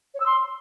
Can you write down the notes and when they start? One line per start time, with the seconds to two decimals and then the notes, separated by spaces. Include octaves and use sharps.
0.14 C#5
0.20 E6
0.25 C6